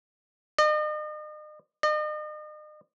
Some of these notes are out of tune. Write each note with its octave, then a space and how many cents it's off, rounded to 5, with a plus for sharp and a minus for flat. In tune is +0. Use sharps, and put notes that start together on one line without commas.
D#5 -40
D#5 -40